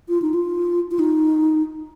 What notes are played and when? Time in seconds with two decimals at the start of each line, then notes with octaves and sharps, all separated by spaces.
0.09 F4
0.22 D#4
0.34 F4
0.91 F4
0.99 D#4